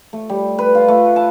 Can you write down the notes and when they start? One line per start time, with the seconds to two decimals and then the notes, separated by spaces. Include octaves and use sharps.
0.13 A3
0.30 G3
0.59 B4
0.75 F4
0.88 A3
1.16 A5